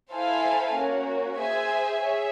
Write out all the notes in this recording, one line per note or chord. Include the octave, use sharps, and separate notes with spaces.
E4 A4 C5 F5 G#5
A#3 C#4 F#4
G#4 C5 E5 G#5
G#4 C#5 E5